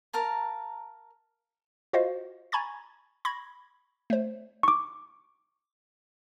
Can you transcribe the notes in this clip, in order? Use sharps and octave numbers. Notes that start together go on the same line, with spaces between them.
A#4 F5 A5 A#5
F4 F#4 C5 D#5 F5
G#5 A#5 B5 C#6 G#6 A6
B5 C#6 G#6 A#6
A3 C5
C#6 D6